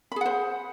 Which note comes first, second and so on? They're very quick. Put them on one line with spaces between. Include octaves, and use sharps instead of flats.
B5 G#4 F#5 C5